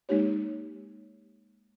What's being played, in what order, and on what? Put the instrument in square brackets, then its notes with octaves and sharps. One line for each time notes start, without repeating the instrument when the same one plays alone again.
[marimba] G#3 A#3 D#4 G4 C#5